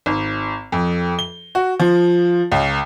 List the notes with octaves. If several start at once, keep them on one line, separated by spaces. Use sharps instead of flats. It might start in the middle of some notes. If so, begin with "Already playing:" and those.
G#1
F2
G7
F#4
F3
C#2